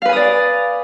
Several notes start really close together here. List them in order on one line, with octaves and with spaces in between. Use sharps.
F5 B4 G#5 D#6 D5